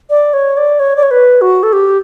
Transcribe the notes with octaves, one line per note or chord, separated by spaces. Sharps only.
D5
C#5
D5
C#5
D5
C#5
B4
F#4
A4
G4